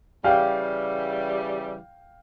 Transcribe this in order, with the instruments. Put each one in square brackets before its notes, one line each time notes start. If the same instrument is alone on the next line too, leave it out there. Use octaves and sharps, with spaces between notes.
[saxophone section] C#3 E3 G3 [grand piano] F5 G5